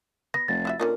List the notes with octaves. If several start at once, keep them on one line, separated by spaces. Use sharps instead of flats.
B3 A#6
F1 A6
E4 F#4 E5
A#2 D3 C#4 D#4 A#4